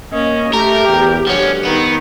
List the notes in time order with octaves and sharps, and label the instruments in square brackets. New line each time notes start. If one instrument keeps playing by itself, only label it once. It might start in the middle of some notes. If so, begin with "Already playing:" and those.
[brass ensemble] A#3 D#5 [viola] C#4
[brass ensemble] A3 [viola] G4 [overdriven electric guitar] A#4
[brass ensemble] E2 G5
[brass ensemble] D2 G2 F#5 [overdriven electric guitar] F3 C#4
[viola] D#3 [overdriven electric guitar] B3